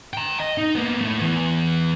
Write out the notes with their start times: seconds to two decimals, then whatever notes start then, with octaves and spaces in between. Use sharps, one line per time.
0.13 G5 A#5
0.40 D#5
0.58 D#4
0.75 A#3 B3
1.01 A3 E4
1.18 E3 B3